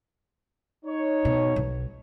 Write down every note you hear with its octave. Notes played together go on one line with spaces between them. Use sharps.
D#4 C#5
B2
B1